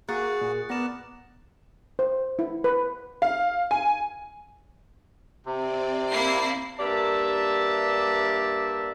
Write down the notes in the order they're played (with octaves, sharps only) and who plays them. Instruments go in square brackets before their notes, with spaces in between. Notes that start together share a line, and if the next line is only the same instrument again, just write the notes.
[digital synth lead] A#3 [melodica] F#4 [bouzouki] G#4 [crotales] F#6 A6 C#7
[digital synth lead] A#2
[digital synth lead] B3 [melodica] A#4 D5 F#5 [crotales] A#6 E7
[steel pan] C5
E4
B4
[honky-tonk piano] F5
G#5
[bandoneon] C3 [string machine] C4 D5
[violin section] A#3 E4 C7
[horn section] G2 A#3 G4 D5 E5 A5